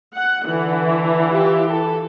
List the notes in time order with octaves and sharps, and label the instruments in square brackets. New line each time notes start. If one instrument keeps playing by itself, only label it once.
[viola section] F#5
[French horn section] D3 [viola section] E3
[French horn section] E4 F4 G4
A4